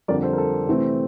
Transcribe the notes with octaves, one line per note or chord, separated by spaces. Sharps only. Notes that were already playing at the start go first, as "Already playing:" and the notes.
F2 D3 G3 D4 A#4 D5
A4 C5
A#4
A4
C3 E3 A3 C4